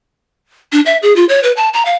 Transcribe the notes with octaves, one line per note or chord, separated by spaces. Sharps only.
D4
E5
G#4
F4
C#5
B4
A5
A#5
F5